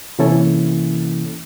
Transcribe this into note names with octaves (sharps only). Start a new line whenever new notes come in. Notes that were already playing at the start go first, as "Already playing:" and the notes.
C3 E3 A#3 C#4 E4 A4